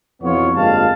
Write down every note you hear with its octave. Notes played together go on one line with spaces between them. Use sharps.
F2 B2 E3 B3 F4 C#5
G1 F2 G#3 A#3 F5 A5